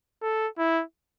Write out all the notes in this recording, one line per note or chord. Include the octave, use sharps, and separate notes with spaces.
A4
E4